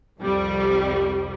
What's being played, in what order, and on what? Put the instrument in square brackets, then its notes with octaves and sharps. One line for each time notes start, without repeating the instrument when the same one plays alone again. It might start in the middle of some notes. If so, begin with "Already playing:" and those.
[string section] C2 F2 G3